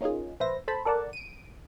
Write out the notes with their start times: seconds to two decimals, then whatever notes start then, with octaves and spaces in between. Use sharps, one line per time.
0.01 A#3 C#4 D#4 F4 G#4
0.40 A#1 B4 C5 E5 A#6
0.68 A4 C5 A5 B5
0.85 A4 A#4 D5 F#5 A5
1.13 D7 D#7